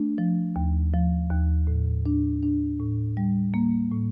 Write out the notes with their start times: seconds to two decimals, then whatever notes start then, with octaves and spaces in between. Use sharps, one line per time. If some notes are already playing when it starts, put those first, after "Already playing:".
Already playing: A3 D4
0.18 F3
0.56 D#2
0.93 F3
1.30 D#2
1.67 A2
2.06 D4
2.43 D4
2.80 A2
3.17 G3
3.54 A#3
3.91 A2